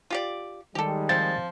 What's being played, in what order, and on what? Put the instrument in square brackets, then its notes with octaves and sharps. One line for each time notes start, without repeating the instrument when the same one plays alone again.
[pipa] F4 G4 D5
[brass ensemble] D#3 G3 G#3 [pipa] G4 A4
[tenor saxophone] F3 [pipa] C4 [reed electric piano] A6